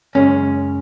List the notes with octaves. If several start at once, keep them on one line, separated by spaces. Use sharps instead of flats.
F#2 C#3 G#3 C#4